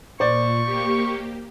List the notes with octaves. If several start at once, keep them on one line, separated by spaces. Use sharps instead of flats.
A#2 C5 D5 C#6
A#3 G4